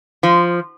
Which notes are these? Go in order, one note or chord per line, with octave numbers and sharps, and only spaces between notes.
F3